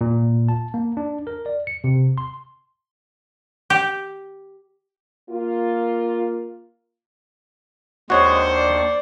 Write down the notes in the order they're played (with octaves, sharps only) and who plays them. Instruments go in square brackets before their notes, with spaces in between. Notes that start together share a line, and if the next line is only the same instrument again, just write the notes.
[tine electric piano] A#2
A5
A#3
D4
A#4
D5
C#7
C3
C6
[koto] G4
[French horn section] A#3 F4
[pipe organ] D#2 D4 C#6 [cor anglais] G#3 [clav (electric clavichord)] F#4 C#5 [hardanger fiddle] C5
[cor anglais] D5